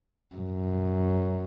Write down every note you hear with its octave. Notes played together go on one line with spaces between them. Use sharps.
F#2